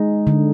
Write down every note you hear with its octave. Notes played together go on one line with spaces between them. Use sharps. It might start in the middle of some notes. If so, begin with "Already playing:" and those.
Already playing: G#3 D#4
D3